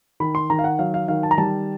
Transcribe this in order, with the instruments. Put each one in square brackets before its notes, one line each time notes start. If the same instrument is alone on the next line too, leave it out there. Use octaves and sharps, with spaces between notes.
[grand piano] D#3 B5
C6
D#3 A#5
F5
F#5
F#3 F5
F5
D#3 F5
A5
A#5
G3 A5